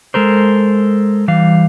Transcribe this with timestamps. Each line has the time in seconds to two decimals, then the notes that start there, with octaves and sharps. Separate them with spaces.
0.14 G#3 A4 A#4 C5
1.28 E3 G3 F5